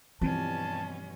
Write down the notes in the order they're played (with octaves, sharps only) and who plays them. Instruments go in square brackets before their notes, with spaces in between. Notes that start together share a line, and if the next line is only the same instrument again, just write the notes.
[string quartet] G2 B2 C#4 [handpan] E3 F3 G3 [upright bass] C4 [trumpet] A5